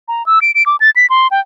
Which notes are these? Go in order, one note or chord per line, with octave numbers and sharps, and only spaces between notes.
A#5
E6
D7
D7
D6
A6
B6
C6
G5